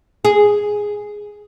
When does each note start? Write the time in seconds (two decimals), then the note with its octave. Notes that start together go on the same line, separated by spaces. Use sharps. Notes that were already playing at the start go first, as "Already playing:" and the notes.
0.25 G#4